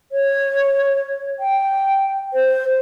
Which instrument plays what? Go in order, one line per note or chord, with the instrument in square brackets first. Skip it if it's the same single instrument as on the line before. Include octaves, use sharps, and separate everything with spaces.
[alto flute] C#5
G5
C5